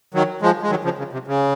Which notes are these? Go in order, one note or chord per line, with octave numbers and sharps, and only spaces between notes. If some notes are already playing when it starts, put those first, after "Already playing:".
D#3 F#3
F3 G#3
G#3
D#3 F#3
C#3 F3
C#3
C3
C#3